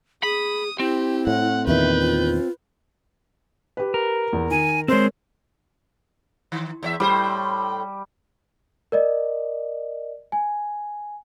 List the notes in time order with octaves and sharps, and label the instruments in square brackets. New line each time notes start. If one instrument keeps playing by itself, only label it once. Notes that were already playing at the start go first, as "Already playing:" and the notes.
[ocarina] G#4 [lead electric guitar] B5 [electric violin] D#6
[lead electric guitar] C4 [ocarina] E4 [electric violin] G4
[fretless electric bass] A2 [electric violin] F#5
[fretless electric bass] E2 A#2 D#3 [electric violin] B4 G6 [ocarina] E5
[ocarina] F4
[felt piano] G4 B4
[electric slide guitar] A#4
[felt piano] E2
[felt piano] D#3 [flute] G#5
[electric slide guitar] G#3 C4 [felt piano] A#4 C#5 [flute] C5
[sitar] D#3
E2 C#5 E5
[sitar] A2 B4 C5 [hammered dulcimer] G3
[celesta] A#4 D5 D#5
G#5